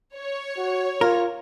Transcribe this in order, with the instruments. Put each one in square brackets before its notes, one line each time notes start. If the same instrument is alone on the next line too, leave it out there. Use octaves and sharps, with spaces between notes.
[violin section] C#5
[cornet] F#4
[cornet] F4 [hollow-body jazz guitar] A#4